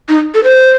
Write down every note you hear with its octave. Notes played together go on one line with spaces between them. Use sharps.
D#4
A4
C5